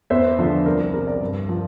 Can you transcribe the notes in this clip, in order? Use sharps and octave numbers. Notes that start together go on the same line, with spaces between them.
E2 C5 E5
D3 F3
C2 A#4 D5
C3 G3 G4 A#4
A#4 D5
G2
F3